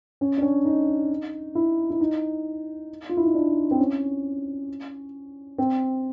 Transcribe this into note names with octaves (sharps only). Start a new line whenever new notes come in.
C#4
D4
C#4
D#4
E4
E4
D#4
F4
E4
D#4
D4
C4
C#4
C4